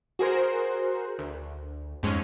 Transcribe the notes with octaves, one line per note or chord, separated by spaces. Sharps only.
F#4 G#4 A#4 C5
D2
F2 G#2 G#3 C#4